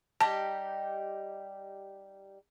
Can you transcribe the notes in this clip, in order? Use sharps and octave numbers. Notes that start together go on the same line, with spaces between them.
G3 D#4 G4 A5